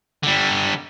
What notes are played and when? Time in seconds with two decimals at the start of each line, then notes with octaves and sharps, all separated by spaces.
0.24 D3 G3